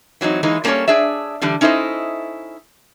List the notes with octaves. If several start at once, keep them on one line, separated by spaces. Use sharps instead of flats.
E3 F#3 C4 D#4
E3 G#3 A#3 D#4
G3 A#3 C#4 F4 A4 C#5
D4 G#4 D5 E5
D3 E3 G3 D4
C#4 D#4 E4 A4 C5 D#5